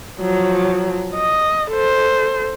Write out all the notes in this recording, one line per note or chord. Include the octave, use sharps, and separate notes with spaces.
F3 F#3
D#5
A4 C5